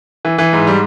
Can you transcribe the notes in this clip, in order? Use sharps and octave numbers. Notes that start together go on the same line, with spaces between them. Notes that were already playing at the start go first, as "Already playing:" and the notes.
E3
E3
G#2
G3